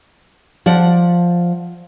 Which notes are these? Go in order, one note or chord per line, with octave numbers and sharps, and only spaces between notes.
F3 D5 F#5